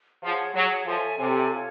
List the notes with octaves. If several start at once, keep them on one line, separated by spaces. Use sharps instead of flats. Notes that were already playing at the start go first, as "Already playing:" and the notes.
F3 G#4 C#5 F#5
F#3 G#4 C#5 F#5
F3 A4 C#5 E5 G#5
C3 A4 C#5 E5 G#5
F4 A4 C#5